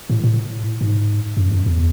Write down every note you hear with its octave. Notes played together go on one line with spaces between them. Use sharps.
A2
A2
G#2
F#2
F#2
E2